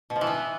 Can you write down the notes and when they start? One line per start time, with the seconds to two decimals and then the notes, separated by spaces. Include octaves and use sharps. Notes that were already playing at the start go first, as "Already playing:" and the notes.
0.10 B2
0.16 F3
0.21 E3
0.27 B3